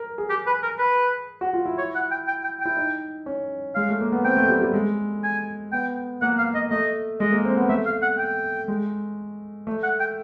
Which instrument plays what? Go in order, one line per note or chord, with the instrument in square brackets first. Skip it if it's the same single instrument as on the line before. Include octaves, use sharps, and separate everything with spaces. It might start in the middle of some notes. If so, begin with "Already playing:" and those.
Already playing: [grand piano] A#4
G#4
[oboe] G4
B4
A#4
B4
[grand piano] F#4
F4
E4
[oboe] C#5
F#5
G5
G5
G5
G5
[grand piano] E4
D#4
C#4
[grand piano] G#3 [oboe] F5
[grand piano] A3
A#3
B3
[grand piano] C4 [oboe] G5
[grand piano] A3
G3
G3
G#3
[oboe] G#5
[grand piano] B3 [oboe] G5
[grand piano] A#3 [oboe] F#5
[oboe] F5
D#5
[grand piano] A3 [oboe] D#5
[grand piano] G#3 [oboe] D#5
[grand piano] A#3
C4
B3
[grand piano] A3 [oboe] E5
[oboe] F5
F#5
G5
[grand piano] G#3
A3
[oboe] F#5
G5